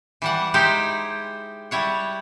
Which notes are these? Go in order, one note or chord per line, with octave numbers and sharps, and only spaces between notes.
E3 G3 F#5
G#3 D#4 E4 G4 C5 G5
G3 E4 C#5 F#5